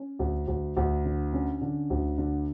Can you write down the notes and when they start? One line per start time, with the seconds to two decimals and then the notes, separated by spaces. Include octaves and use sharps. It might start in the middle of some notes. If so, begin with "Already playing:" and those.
Already playing: C#4
0.19 D2
0.47 D2
0.77 D2
1.05 D3
1.33 C#4
1.62 D3
1.90 D2
2.18 D3